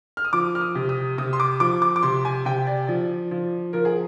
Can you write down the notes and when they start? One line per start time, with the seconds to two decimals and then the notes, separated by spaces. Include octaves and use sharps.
0.17 F6
0.25 D#6
0.33 F3 D6
0.55 F6
0.61 D#6
0.75 C3
0.89 D#6
1.18 C3 D#6
1.33 C6
1.40 D6
1.60 F3 D6
1.82 D6
1.96 D6
2.02 C3 C6
2.25 G#5
2.45 C3 G5
2.67 D5
2.88 F3 D5
3.31 F3
3.73 F3 A#4
3.85 G#4